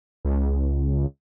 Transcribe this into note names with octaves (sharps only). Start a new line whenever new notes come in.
C#2